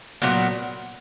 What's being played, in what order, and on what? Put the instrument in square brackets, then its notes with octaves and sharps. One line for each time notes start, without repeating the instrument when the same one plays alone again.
[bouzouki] A#2 F#3 B3 D4